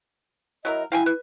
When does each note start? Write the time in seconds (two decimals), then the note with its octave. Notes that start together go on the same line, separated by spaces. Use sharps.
0.65 F#3 E4 A#4 D#5
0.92 E4 F5 G5 G#5
1.06 B4